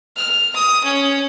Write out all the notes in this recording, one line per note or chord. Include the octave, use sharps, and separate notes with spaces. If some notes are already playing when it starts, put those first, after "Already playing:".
F6
D#6
C#4